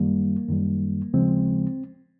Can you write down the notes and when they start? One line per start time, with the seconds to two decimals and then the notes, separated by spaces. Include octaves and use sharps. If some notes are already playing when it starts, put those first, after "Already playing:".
Already playing: F#2 D#3 G3 A#3
0.49 F#2 D#3 G3
1.13 D#2 C#3 F3 G#3 C4